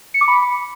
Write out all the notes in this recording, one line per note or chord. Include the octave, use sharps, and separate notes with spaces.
C#7
D6
B5